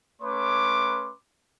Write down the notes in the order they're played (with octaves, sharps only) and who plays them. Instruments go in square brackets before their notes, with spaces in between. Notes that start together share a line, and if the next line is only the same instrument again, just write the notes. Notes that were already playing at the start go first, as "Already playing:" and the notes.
[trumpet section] A3 C#4 B4 C#5 C6 D6